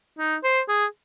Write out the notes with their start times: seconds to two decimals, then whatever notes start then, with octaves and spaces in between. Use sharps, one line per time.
0.18 D#4
0.44 C5
0.68 G#4